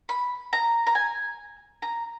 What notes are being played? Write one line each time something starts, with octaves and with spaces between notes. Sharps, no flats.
B5
A#5
A#5
G#5
A#5